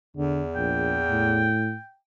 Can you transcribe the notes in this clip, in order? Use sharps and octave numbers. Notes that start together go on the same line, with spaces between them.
E2 D3
A#1 G5
A2